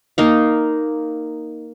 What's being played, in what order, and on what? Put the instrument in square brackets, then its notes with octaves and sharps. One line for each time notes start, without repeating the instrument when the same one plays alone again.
[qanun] A#3 D#4 F5